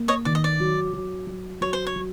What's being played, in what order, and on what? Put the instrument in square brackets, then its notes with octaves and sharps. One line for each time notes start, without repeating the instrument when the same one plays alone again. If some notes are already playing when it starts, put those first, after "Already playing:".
Already playing: [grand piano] A#3
[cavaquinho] C#5 D#5
[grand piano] D#3 [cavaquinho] D5
[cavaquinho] D#5
D5
[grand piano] F#3
F#3
F#3
[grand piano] F#3 [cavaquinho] C#5
[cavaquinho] C5
C#5
[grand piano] F#3